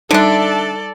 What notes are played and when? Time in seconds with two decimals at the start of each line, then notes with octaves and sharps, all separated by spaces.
0.11 D3 G3 D4 D#4 A4 D5 E5 A5